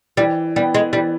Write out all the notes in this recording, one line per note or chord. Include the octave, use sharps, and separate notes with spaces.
E3 G3
G3 B3
G#3
E3 G3